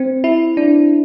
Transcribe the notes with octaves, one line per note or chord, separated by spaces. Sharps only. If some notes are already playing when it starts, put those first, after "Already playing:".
Already playing: C4
E4
D4